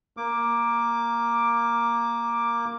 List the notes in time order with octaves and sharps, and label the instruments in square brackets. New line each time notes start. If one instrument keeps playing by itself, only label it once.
[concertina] A#3 D6